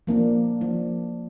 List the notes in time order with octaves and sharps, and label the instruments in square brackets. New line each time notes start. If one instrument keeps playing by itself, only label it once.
[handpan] F3 A#3 D4
F3 A#3 D4